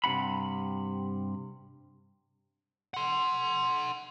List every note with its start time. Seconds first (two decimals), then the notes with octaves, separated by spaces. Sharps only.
0.04 G2 C3 D4 F#5 B5
2.94 F#5 C6